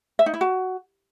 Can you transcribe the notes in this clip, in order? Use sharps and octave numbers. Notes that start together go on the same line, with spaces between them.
E5
D#4
E4
F#4